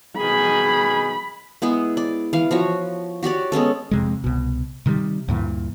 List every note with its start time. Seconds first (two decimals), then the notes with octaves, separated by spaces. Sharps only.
0.19 B2 D#3 G#4 B5
1.62 G#3 B3 E4 G#4
1.97 D5
2.33 E3 F5
2.51 F3 F#4 C#5
3.23 F#4 G4 C#5 D5
3.52 G#3 B3 C#4 A4
3.91 F2 C3 G#3
4.24 C2 B2
4.86 C3 D#3 F3 G3
5.28 D2 G2 A#2 E3